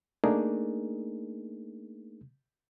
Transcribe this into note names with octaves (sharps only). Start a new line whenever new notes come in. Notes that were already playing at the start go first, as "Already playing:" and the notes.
A3 A#3 D4 D#4 G#4 A#4